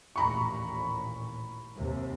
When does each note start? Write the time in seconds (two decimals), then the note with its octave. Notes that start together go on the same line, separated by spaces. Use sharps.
0.16 A1 D#2 A#2 A#5 B5 C#6
1.75 D#2 C3